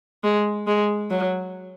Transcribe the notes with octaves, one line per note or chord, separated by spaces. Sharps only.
G#3
G#3
F#3